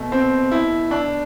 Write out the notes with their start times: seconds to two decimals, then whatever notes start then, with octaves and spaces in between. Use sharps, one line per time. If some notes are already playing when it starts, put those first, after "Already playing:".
Already playing: B2 A3
0.12 C4
0.51 E4
0.91 D4